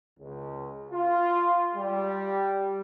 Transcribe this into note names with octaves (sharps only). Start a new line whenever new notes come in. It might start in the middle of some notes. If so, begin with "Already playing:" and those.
C#2
F4
G3